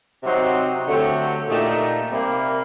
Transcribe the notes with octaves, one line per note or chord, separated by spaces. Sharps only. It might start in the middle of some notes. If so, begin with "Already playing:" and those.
C3 F#3 C4 D#4 F#4
D3 F#3 A3 C4 G4
A#2 A3 D#4 G4 D5
C3 G3 A#3